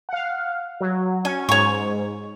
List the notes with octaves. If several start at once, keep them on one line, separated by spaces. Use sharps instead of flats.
F5 F#5
F#3
C#4 G#5
G#2 C#5 C#6